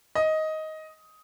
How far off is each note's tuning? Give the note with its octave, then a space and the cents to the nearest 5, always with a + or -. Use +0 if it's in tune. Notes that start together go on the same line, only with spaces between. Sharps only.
D#5 +10